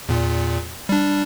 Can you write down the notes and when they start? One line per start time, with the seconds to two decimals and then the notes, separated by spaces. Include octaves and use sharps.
0.09 E2 A#2
0.89 G3 D4